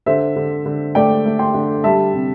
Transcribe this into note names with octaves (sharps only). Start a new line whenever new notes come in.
D3 C5 E5
D3
D3
A3 D5 G5
A3
G5 C6
D3
G3 E5 A5
C3